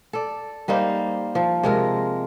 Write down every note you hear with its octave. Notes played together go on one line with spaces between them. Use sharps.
A4 D5
G3 A#3 D#4 C5
F3
C3 G#3 A#4